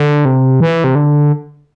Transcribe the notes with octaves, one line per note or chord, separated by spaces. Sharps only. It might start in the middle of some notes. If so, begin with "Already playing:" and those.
Already playing: D3
C3
E3
C3
D3